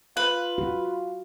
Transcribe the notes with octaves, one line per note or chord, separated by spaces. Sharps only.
F4 B4
F#4